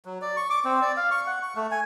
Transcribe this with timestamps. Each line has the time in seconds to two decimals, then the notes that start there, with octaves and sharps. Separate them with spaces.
0.05 F#3
0.22 D5
0.36 C#6
0.50 D6
0.65 C4
0.82 D5
0.97 F5
1.11 C#6
1.27 F#5
1.42 C#6
1.56 A3
1.71 G#5